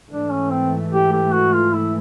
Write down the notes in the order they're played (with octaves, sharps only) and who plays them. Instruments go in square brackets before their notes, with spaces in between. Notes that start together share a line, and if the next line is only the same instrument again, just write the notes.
[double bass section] G#2 E3 A3 [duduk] D4
[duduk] C#4
C4
G4
G4
F#4
F4
E4